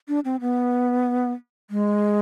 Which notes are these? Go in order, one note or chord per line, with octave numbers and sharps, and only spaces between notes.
D4
C4
B3
G#3